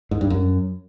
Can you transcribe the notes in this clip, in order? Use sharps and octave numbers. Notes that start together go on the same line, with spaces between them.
G#2
G2
F#2